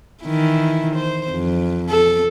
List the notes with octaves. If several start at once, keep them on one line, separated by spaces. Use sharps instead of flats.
D#3 E3 E4
C5
F2
A4